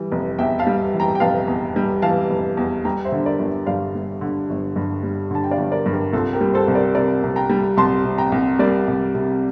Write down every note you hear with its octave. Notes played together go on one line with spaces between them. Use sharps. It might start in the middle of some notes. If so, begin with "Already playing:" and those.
Already playing: E3 G3
F1
E2 E5 G5
F5 A5
G3
E3
G5 A#5
G5
F1 F5 A5
E2
G3
E3 F5 A5
F1
E2
G3 G5 A#5
C5 E5
D3
A#4 D5
G1
G2 D5 F5
G3
D3
G1
G2
G3
D3 A5
G5
D5 F5
G1
A#4 D5
G2
G4 A#4
C2 F4 A4
G4 A#4
G3
A4 C5
C2
A#4 D5
C3 A#4 D5
C2
G5 A#5
G3
C2 A5 C6
C3
G5 A#5
C2
G3 A#4 D5
C2
C3